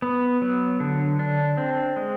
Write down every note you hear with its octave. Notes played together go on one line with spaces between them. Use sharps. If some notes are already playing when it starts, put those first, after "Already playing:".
B3
F#3
D3
D4
C4
G#3